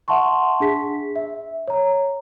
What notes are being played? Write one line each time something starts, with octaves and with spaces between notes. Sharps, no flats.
E5 F#5 A5 C6 C#6
D4 G#4 B6
E5
C#5 A#5